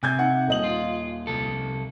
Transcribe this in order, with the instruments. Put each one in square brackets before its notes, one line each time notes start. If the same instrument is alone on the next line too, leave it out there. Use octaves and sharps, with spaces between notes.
[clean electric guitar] C3 [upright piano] G#5 G6 G#6
[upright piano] D#4 F#5
D#1 D#5 F#7
[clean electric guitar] F4
C2 A4